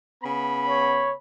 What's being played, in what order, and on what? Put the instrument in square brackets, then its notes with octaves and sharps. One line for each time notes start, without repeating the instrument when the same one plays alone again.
[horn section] C#3 B3 B5
[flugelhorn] C#5